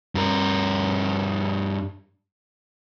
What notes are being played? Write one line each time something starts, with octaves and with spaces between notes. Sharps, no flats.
G2 A#4